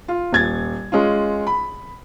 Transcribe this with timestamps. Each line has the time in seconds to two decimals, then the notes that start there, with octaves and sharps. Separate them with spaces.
0.08 F4
0.33 D#1 G#6 A6
0.92 G#3 C#4 F4
1.47 B5